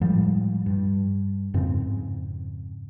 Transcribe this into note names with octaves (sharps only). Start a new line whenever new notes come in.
A2 F3 G3 G#3
G2
F2 G#2 C#3 C4